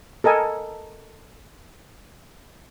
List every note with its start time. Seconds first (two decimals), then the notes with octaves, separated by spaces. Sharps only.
0.24 A4 A#4 D#5 G#5